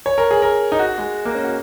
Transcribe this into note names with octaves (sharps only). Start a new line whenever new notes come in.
C#5
A#4
G#4
A#4
D#4
F#4
G#3
A#3
C#4
F#4